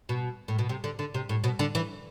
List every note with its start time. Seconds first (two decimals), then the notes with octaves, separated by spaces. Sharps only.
0.09 B2
0.48 A2
0.59 B2
0.69 C3
0.84 D3
0.99 D3
1.14 C3
1.29 A2
1.44 B2
1.59 D3
1.75 E3